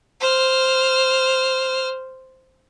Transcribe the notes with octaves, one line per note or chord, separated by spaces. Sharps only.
C5 F6